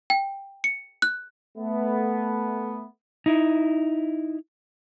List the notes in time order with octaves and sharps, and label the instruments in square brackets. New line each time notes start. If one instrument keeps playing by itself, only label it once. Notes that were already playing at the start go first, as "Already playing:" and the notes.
[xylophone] G5
C#7
F#6
[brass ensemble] A3 B3
[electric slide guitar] D#4 E4